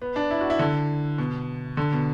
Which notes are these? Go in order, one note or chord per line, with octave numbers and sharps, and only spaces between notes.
B3
D4
E4
F#4
E4
D3
B2
D3
B2